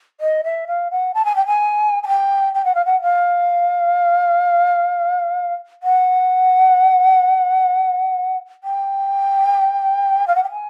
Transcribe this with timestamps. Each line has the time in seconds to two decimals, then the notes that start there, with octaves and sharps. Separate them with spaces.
0.20 D#5
0.44 E5
0.67 F5
0.91 F#5
1.14 A5
1.25 G#5
1.36 G5
1.46 G#5
2.03 G#5
2.08 G5
2.54 G5
2.65 F#5
2.75 F5
2.85 F#5
3.02 F5
5.83 F#5
8.64 G5
10.27 F5
10.35 F#5
10.43 G5
10.51 G#5